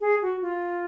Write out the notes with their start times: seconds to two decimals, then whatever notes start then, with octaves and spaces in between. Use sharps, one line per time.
0.01 G#4
0.22 F#4
0.42 F4